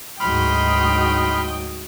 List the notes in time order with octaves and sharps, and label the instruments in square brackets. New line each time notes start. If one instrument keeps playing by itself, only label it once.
[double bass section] D2 G#2 F#3 [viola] D#5 G5 [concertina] B5 C6 F6